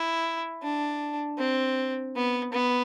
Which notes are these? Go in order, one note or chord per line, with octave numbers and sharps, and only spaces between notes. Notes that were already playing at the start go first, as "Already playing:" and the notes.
Already playing: E4
D4
C4
B3
B3